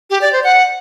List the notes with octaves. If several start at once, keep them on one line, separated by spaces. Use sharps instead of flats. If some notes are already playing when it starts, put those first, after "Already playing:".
G4
D5
C5
F#5